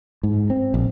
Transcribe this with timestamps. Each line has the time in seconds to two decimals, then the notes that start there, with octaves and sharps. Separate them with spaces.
0.23 G#2
0.50 C4
0.74 A#1